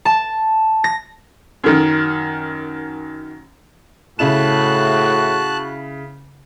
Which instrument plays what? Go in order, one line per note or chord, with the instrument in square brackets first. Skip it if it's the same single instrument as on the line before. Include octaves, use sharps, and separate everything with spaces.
[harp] A5
A#6
[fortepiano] F#2 D#3
[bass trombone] A2 [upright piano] C#3 E4 E7 [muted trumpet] F#4 [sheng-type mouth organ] A5 F#6